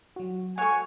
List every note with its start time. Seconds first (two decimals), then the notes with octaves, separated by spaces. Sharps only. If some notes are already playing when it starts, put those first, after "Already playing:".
0.16 F#3 F#4
0.58 A4 C#5 F#5 G#5 C#6